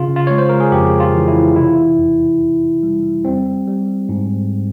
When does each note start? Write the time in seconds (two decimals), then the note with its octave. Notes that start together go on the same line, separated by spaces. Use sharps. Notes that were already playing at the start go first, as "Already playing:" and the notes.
Already playing: C#3 F4
0.16 F4
0.27 G#3 C#5
0.38 C5
0.49 A#4
0.60 G#4
0.72 F2 G4
1.00 F4
1.14 E3
1.28 E4
1.56 C3 E4
1.98 E2
2.41 E2
2.83 G3
3.25 G3 C4
3.67 G3
4.09 G#2